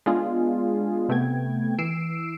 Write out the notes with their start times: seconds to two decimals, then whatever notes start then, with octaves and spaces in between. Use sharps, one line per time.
0.06 G#3 B3 D4 F4 G#4
1.09 C3 A3 B3 G5 G#6
1.78 E3 E6 C7 D7 E7